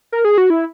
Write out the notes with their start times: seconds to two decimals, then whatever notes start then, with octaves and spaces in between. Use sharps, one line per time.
0.12 A#4
0.25 G#4
0.38 F#4
0.50 E4